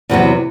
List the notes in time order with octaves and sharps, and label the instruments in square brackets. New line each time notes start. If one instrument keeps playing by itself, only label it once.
[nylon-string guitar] E2 C3 F#3 B3